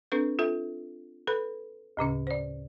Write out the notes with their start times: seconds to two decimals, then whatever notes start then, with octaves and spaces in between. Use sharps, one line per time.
0.12 C4 D4 A4 B4 G6
0.39 F4 A4 E5
1.27 A4 B4 B5 F#6
1.97 D2 A2 C#3 C#4
2.27 C5 D5